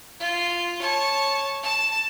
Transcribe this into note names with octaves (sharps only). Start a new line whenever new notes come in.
F4
C#5 A5
A5